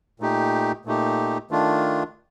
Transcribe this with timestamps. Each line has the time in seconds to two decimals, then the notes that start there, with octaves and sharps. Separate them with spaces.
0.20 A#2 A3 D#4 G4
0.85 A#2 A3 D#4 G4
1.51 D#3 A3 D4 F4